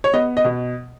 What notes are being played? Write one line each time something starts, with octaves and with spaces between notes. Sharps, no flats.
C#5
B3 D#5
D#5
B2